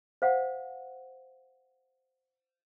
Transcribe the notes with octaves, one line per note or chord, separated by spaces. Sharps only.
C5 F5 F#5